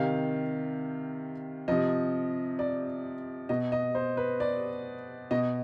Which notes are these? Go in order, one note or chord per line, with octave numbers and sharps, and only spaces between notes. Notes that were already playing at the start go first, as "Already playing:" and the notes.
Already playing: C3 D#3 F5
C3 F3 D#5
D5
B2 D#5
D#5
C5
B4
D5
B2 D#5